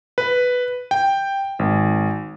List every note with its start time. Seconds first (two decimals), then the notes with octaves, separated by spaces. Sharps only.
0.18 B4
0.91 G5
1.59 G#1